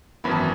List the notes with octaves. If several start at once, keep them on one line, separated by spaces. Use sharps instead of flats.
G#1 F#2 E3 B3 E4 B5
A5